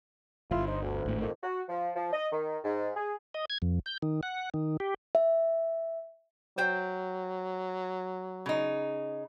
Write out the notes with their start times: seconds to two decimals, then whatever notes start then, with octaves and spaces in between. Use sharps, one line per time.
0.51 D1 G1 E4 F4
0.67 D#4 C5
0.82 D2
1.05 G#1 A2
1.21 F2 D#3 A#3
1.43 F#4
1.69 F3
1.96 F3
2.13 D#5
2.32 D#3
2.64 G#2
2.96 G#4
3.34 D#5
3.50 G#6
3.62 F2
3.86 G6
4.02 D#3
4.23 F#5
4.54 D#3
4.80 G4
5.15 E5
6.58 F#3 C5 G5
8.46 C#3 D#4